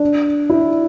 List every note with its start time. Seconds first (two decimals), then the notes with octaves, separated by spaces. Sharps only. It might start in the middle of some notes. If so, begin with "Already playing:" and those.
Already playing: D4
0.50 E4